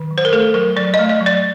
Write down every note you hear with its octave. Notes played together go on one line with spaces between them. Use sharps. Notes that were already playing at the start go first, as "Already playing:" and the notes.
Already playing: D#3
F#3
C5
A#4
A3 A4
F#3 A#4
F#3 D5
D#5
A3
D#5
F#3
D5